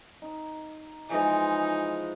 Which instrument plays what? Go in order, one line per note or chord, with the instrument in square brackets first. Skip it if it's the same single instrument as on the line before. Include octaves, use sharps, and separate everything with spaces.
[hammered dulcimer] D#4
[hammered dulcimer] E3 F3 G#3 [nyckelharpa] D#4